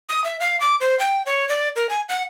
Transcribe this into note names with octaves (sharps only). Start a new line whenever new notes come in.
D#6
E5
F5
D6
C5
G5
C#5
D5
A#4
G#5
F#5